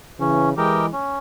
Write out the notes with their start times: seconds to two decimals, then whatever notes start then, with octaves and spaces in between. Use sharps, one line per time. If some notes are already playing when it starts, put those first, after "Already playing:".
0.20 C#3 E3 C#4
0.56 E3 G#3 G4 A#4 D#5 G5
0.93 C#4